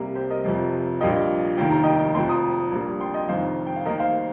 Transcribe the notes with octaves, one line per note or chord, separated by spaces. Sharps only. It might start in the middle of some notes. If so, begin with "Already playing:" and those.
Already playing: C2 C3 G3 A#3
G4 C5
A#4 D#5
F1 F2 C3 F3
A#1 A#2 G3 A#3 D#5 G5
F1 D#2 D#3 A#3 G5
A#5
D#5 G5
F1 F2 F3 G5 C6
A#5 D#6
A#1 A#2 G3 A#3
G5 C6
D#5 G5
F1 F2 D#3 C5 F5
G5
F5
D#2 D#3 A#3 A#4 D#5
C5 F5